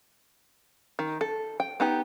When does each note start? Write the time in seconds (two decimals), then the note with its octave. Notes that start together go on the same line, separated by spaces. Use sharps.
0.99 D#3
1.21 A4
1.60 G5
1.80 B3 D#4 G4